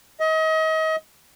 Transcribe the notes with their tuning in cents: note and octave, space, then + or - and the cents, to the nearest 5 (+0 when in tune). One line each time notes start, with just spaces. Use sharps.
D#5 +35